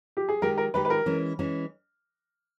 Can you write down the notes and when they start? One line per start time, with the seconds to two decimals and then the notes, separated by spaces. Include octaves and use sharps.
0.17 G4
0.29 G#4
0.42 D#3 G#3 D#4 G4 A#4
0.58 A#4
0.74 D#3 G#3 D#4 G4 B4
0.85 B4
0.90 A#4
1.06 E3 G#3 C#4
1.39 E3 G#3 C#4